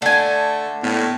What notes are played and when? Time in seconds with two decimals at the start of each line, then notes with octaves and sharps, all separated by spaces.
0.02 D3 A3 D5 G#5
0.83 A2 B3